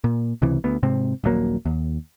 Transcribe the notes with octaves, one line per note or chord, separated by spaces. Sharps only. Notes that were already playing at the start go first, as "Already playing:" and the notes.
A#2
C#2 C3 E3
D2 B3
G#2 C3 C4
D#1 A#1 F#3 A#3
D#2